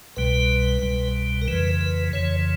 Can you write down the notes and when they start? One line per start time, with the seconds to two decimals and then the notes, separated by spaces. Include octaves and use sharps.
0.16 C2 B2 G3 B4
0.82 C2 B2 G3
1.42 A#4
1.48 F2 C#3 E3 B4
1.81 B4
2.13 F2 C#3 E3 C#5